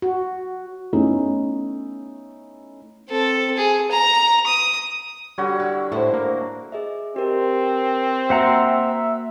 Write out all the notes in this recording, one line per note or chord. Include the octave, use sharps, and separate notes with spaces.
F#4
A3 B3 C#4 D#4 E4
C4 A4
G#4
A#5
D#6
D3 G3 F#4 C#5
E4
A2 E4 A4 C5
A#3
G#4 D#5 E5
C4 G4 A#4
A#3 F#4 C5 E5 F#5 A#5